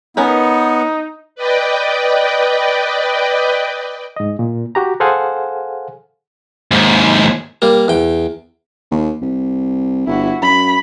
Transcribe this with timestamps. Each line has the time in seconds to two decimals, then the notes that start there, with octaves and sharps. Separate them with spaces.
0.17 B3 C#4 D#4 A#4 B4
1.35 B4 D5 D#5 G5
4.16 G#2 D#5
4.39 A#2
4.75 F#4 G4 A#5
5.00 G#4 A4 C5 F5 F#5 G#5
6.71 D#2 G#2
7.62 G3 A#3
7.88 E2 G5
8.91 D#2
9.22 C2
10.06 G1 E4 F#4
10.42 F#2 B5